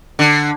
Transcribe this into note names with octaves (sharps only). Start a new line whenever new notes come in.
D3